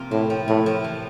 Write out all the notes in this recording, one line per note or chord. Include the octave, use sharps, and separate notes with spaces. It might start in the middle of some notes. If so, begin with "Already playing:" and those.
Already playing: C3 F3 A#3 F4
A2 C4
F3
A2 E4
F3
E3